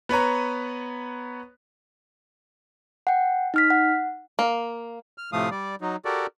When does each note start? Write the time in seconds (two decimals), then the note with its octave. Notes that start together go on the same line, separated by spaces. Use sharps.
0.09 B3 B4 C#5 A#5
3.07 F#5 G5
3.54 D#4 F6 B6
3.70 F#5
4.39 A#3
5.18 F6
5.33 A2 C3 F3 A3 F5 D#6
5.51 G3 D5
5.81 F#3 D#4
6.05 F#4 G4 A4 A#4 D5